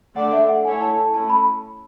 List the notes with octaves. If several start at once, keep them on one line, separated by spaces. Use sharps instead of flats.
D3 A3 D4 A4 D5 F#5
E5
F#5
A3 E4 A4 C#5 G#5
A5
A5
A3 C#4 E4 A5
B5